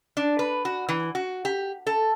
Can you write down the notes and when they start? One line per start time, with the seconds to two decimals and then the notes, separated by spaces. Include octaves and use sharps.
0.17 D4
0.39 B4
0.65 F#4
0.89 E3
1.15 F#4
1.45 G4
1.87 A4